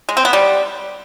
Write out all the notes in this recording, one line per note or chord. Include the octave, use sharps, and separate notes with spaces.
G#3
C4
B3
G3